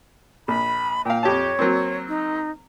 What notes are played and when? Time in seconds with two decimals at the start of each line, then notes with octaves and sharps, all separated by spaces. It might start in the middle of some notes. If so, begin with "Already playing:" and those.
0.48 A#1 B5
1.05 A#2 F5 G5
1.23 F2 G4 C#5 A5
1.59 F#3 A#3 C4
2.08 D#4